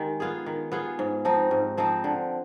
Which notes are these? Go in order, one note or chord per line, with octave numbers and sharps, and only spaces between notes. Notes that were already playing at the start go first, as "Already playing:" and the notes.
Already playing: D#3 G#3 G4
B3 F4 G#4
D#3
B3 F4 G#4
G#2
F3 C4 D#4
G#2
F3 C4 D#4
D3